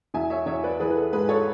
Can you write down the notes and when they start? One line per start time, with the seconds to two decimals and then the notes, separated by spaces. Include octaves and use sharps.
0.14 E2 E5 G#5
0.30 C#5 E5
0.46 E2 C#5 E5
0.64 B4 D5
0.80 E3 G#4 B4
0.90 B4
0.96 A4
1.13 G#2 G#4 B4
1.29 A4 C#5